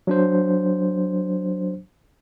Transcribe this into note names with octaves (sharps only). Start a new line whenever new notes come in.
F#3 D4 C5